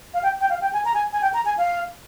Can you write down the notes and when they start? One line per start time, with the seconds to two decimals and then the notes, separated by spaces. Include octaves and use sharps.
0.14 F5
0.23 G5
0.41 G5
0.50 F5
0.61 G5
0.73 G#5
0.85 A#5
0.94 G#5
1.13 G#5
1.22 G5
1.34 A#5
1.45 G#5
1.58 F5